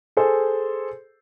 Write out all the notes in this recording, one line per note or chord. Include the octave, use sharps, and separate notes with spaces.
G#4 A4 C5